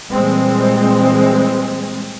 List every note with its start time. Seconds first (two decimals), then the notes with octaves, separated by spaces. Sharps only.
0.10 A#2 E3 G3 G#3 C4